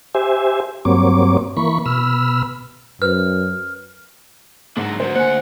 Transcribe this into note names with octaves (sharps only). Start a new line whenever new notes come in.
G4 C5 E5 G#5
G2 F#3 A#3 C4 C#5 D6
E3 A#3 B5 C#6
B2 B5 E6 F6
F#2 B4 C5 F6
G#2 F#3 D4
D2 F#3 C5
D2 A#3 C5 F#5 G#5 F#6 C#7